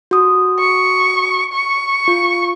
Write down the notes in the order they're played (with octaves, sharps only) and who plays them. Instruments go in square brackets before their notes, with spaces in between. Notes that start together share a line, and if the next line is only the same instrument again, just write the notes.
[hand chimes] F#4 D#6
[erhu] C#6
C#6
[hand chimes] F4